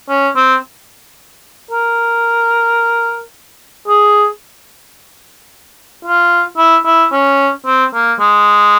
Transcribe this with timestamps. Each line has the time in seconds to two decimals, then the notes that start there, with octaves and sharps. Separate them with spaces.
0.09 C#4
0.36 C4
1.71 A#4
3.88 G#4
6.05 F4
6.58 E4
6.85 E4
7.12 C#4
7.66 C4
7.94 A#3
8.20 G#3